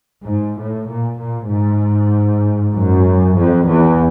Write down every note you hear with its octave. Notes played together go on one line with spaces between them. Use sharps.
G#2
A2
A#2
A#2
G#2
F#2
F2
E2